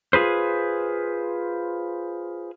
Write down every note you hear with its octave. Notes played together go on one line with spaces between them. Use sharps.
F4 G#4 B4 C5